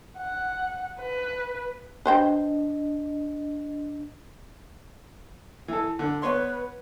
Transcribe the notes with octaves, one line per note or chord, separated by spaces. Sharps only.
F#5
B4
D4 B4 C5 D#5 G5
E3 A4
D3
B3 B4 C#5 C6